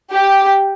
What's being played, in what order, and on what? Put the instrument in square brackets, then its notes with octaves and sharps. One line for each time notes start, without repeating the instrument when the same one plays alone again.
[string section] G4